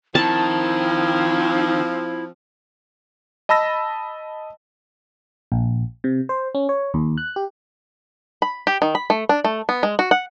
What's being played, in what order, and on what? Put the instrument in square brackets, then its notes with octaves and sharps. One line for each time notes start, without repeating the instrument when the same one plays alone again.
[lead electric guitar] D#3 [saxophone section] F3 C4 [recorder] E4 [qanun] A5
[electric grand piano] D#5 A5 B5 E6 A#6
[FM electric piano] A#1
C3
C5
C#4
C#5
D#2
F#6
G4
[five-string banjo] B5
G4
D#3
B5
A3
D4
A3
B3
G#3
F#4
F#5